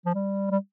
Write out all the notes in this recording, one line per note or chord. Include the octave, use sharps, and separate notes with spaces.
F3
G3
G3